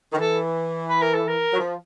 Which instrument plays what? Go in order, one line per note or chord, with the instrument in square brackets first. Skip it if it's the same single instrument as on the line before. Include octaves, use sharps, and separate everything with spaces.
[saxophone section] D#3
[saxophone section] E3 [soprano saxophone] A4
[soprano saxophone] B4
A#4
A4
A#4
[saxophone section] F#3
F3